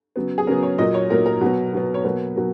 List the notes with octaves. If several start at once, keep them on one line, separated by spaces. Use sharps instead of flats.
C#3 F#3 B3
G#4
C#3 F#3 B3 A#4
C#5
A#2 F#3 A#3 D#5
C#5
A#2 F#3 A#3 A#4
A#4
B2 F#3 B3
B2 F#3 B3
C#5
B2 F#3 A#3 B4
B2 F#3 A#3